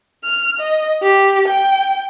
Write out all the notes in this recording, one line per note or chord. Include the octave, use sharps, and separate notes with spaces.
F6
D#5
G4
G5